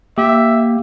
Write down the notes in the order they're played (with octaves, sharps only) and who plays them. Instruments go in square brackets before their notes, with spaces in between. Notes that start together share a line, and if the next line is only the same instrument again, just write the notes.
[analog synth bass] A#3 [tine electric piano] G4 [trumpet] E5